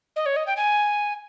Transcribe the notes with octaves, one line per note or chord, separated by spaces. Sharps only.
D#5
C#5
D#5
G5
G#5